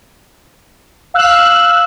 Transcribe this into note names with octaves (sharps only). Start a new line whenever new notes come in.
F5 E6 F#6